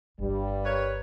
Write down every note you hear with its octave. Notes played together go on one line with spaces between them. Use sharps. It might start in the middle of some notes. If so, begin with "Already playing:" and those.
G1 G2 G3 D4
A#4 B4 C#5